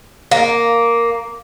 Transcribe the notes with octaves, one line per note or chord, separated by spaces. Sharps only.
A#3